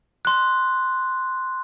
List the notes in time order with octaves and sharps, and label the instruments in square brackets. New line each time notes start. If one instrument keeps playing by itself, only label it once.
[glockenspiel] C6 F#6